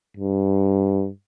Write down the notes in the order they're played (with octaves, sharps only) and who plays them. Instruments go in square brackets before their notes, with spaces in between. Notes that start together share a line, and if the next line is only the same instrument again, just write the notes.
[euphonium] G2